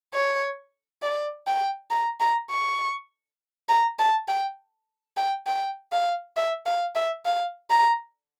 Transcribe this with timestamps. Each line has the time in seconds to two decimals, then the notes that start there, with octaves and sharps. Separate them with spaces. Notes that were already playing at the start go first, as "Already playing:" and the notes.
0.14 C#5
1.03 D5
1.47 G5
1.91 A#5
2.20 A#5
2.50 C#6
3.69 A#5
3.99 A5
4.28 G5
5.17 G5
5.47 G5
5.92 F5
6.37 E5
6.66 F5
6.95 E5
7.25 F5
7.70 A#5